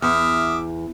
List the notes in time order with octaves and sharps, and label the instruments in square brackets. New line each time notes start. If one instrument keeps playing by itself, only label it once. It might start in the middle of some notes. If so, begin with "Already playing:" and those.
[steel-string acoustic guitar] E2 [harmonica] E5 D6 F6 [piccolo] D#6